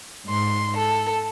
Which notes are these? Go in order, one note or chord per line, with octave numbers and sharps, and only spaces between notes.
G#2 C6
A4